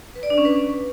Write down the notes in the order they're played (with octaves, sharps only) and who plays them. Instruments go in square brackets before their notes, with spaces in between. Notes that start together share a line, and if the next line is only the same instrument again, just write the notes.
[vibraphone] B4
D5
D4
C#4
B4